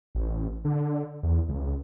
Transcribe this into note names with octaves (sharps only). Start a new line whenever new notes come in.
A1
D3
E2
C#2